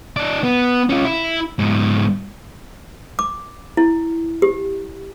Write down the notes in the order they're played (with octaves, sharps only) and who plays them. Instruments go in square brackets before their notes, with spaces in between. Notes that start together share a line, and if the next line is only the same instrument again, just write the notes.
[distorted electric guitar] D#4 D5
B3
C#4 F4
E4
G#2 B3
[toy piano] D6
E4
G4